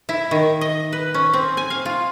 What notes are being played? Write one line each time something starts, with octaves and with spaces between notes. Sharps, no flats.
E4
D#3
D#5
B4
C#4
C4
G#5
F5
F4